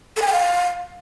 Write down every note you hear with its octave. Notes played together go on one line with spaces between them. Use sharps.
A4
G#5
G5
F5